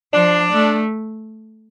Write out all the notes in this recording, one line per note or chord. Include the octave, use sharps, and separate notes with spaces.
F3 D4
A3